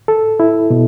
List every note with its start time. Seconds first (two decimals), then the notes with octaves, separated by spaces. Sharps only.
0.08 A4
0.40 E4
0.70 B2